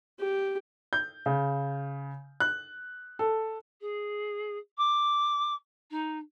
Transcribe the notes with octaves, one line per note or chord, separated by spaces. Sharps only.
G4
G6
C#3
F#6
A4
G#4
D6
D#4